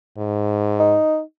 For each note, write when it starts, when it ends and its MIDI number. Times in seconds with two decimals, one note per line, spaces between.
0.18 0.95 44
0.80 1.21 63